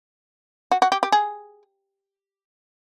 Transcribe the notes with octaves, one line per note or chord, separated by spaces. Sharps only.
F#4
F#4
G4
G4
G#4